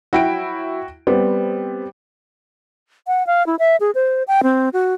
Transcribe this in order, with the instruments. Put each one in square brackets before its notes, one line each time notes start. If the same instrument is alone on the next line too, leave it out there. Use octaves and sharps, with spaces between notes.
[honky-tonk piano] F#3 E4 [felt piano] F#4 G5 D7
[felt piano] G3 [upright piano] B3 [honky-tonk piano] C4
[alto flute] F#5
F5
E4
E5
G#4
C5
G5
C4
F#4